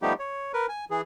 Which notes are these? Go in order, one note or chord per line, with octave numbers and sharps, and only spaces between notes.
F3 G3 A3 B3 D#4 G4
C#5
A#4 B4
G#5
E3 G#4